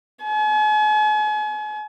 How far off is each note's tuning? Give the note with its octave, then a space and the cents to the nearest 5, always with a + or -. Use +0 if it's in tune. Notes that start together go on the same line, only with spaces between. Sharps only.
G#5 +40